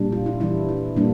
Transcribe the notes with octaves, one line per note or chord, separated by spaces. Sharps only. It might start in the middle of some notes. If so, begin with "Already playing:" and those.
Already playing: A#2 G3 D4
F4
E4
E3 G3 D4 E4
E4
A#2 G3 A#3 D4